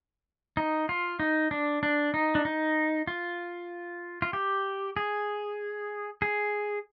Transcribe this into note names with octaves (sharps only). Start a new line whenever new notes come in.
D#4
F4
D#4
D4
D4
D#4
D4
D#4
F4
F4
G4
G#4
G#4